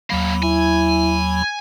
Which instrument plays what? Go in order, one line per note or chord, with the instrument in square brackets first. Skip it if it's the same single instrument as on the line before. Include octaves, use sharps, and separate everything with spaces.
[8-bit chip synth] D#2 F#3 B5 [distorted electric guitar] A2 A#3
[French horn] E4 [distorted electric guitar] G#5